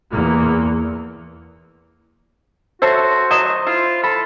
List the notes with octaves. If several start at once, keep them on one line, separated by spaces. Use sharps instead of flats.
E2 A#3
F#4 A4 C5 C#5 E5
F#3 A3 D#5 E7
E4 F4
A4 B5